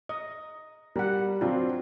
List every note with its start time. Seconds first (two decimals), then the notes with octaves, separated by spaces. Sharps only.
0.09 D#5
0.96 G3 A#4 F#5
1.41 F#3 C4 D4 F4